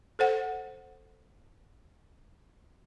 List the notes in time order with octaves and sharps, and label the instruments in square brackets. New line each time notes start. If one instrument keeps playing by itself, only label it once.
[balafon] A4 C5 F#5